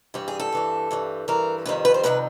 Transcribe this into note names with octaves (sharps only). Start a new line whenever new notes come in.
G2 E3 G3
G#4
A4
G2 E3 G3
G2 E3 G3
G2 E3 G3 A#4
F2 C3 D#3 G3 B4
B4
C5
F2 C3 D#3 G3 B4